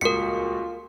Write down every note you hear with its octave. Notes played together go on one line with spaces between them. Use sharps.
D#1 C#2 F4 F#4 A#4 B6 C#7